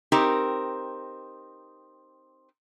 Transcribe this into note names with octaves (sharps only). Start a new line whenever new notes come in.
C4 D#4 G4 A#4